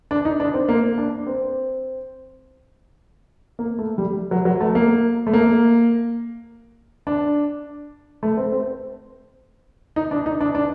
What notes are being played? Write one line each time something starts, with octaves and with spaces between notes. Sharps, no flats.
D4
D#4
D4
C4
A#3
D4
C4
A#3
A3
G3
F#3
F#3
A3
A#3
A3
A#3
D4
A3
C4
C4
D#4
D4
D#4
D4
D4